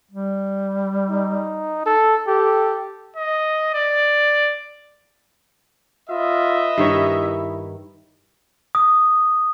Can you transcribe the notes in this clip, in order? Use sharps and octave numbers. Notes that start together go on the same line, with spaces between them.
G3
D#4
A4
G4 A4
D#5
D5
F4 B4 D#5 E5
G2 D#3 E4 C#5
D#6